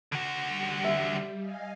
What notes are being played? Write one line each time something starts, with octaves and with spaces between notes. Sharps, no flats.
D3 F#4
G3
E5
D#5 F5 G#5